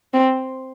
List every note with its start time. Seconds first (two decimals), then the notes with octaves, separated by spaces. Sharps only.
0.14 C4